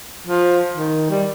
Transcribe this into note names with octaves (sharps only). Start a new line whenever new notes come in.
F3
D#3
G3